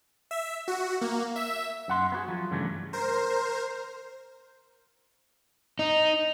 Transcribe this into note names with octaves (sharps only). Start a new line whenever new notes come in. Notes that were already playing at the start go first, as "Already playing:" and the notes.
E5
F#4
A#3
E5
F#2 F#5 C6
B3 F#4 G#4
F3 F#3
G2 C#3 E3 G3 A3
A#4 C5
D#4